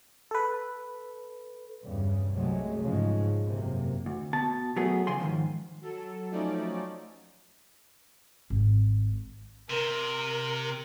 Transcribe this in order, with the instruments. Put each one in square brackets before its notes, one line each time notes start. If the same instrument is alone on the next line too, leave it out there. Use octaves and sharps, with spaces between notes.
[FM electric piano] A4 B4
[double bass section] E2 G2 C#3 G3
C2 F#2 C3 F#3 G#3 A3
G#2 C#3 F3 G#3
F#1 C3 A#3
[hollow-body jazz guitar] D2
B2 A5
F#3 A3 B3 G#4
C#3 F3 G#5 C6
G#2 B2 D#3 F3
[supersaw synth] F#3 A4
F3 F#3 A3 C#4 D#4 D5
[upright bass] G#1
[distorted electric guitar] C3 [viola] A#4